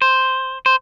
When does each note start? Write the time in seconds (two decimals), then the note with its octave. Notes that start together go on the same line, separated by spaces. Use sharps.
0.02 C5
0.66 C5